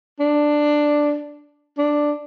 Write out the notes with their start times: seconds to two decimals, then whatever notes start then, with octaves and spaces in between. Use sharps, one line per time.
0.20 D4
1.78 D4